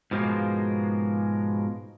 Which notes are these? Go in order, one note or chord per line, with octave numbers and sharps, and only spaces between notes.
G#2 B2 F3 F#3 G#3 A#3